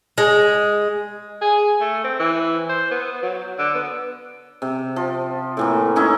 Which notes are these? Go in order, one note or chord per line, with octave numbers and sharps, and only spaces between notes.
G#3
G#4
A3
C4
E3
C5
B3
F#3
D3
B3
C3
F3
A2 E3 A#3
C#4 D#4 E4